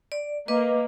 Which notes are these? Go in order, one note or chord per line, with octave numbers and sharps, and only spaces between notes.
D5
A#3 B4 D#5 D6